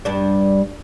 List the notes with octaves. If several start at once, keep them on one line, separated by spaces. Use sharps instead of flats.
G2 D4